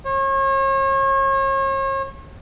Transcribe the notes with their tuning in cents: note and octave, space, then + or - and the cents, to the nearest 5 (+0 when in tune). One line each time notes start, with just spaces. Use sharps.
C#5 -40